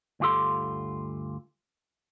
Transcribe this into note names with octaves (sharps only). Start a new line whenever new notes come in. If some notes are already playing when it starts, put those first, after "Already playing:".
D2 G2 F4 G4 A4 C6